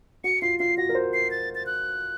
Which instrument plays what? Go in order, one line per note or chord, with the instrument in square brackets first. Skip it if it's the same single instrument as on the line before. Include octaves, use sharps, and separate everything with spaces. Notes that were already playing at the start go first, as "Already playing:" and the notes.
[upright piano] F#4 [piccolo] C#7
[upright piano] F4 [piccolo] C7
[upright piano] F4 [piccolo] C7
[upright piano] F#4 [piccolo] A#6
[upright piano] A#4
C5
[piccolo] C7
A6
A6
F#6